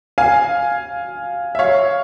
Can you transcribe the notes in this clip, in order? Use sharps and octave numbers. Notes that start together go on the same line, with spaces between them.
F5 G#5
E5
C#5 F5